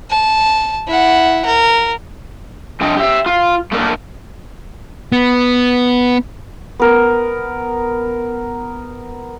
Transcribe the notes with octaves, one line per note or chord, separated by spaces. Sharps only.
A5
E4 F#5
A#4
C3 F3 D4 D#5 G5
G4 E5
F4
A3 A#3 D4 A#4
B3
B3 A#4